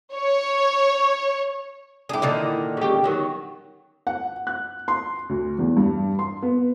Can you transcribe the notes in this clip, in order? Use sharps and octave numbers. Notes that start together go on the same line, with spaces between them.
C#5
D4 E4 G4 G#4
A#2 D3 D#3
C#3 G4
D#3 F#3 B3
F#5
F#6
C6
D2
E2
G2
C6
B3